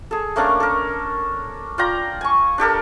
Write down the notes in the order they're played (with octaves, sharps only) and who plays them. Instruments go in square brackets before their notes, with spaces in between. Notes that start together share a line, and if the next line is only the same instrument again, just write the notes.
[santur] G#4 A4
A3 A#3 C#4 D4
A4 A#4
F4 D5 G5 A#5
G#5 C#6
D4 G4 A4 A#4